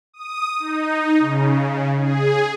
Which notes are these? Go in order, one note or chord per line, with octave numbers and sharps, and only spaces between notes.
D#6
D#4
C#3
G#4